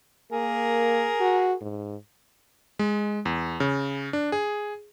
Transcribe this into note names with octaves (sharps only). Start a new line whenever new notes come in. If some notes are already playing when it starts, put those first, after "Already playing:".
A#3 G#4 A#4
F#4
G#2
G#3
E2
C#3
D4
G#4